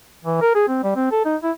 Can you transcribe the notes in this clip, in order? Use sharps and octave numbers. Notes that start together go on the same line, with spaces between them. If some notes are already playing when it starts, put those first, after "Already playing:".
E3
A#4
G#4
C4
G3
C4
A4
D#4
E4